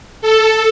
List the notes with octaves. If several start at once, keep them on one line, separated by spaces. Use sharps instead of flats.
A4